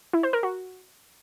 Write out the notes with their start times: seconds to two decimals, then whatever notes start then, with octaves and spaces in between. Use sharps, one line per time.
0.13 E4
0.23 C5
0.33 A#4
0.43 F#4